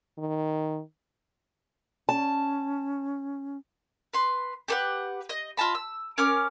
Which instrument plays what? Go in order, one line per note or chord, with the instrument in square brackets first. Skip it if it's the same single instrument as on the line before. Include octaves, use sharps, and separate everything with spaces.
[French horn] D#3
[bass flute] C#4 [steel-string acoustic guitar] A5
[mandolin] B4 C6
G4 A4 B4 F#5
D#5
F4 D#5 A5 B5
E6
C#4 A#4 D6 F6